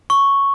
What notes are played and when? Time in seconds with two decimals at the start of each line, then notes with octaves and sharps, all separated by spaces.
0.10 C#6